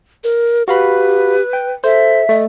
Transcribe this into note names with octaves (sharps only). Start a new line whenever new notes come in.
A#4
F#4 G4 B4 F5 B5
G5
A4 C5 E5
A3 D#5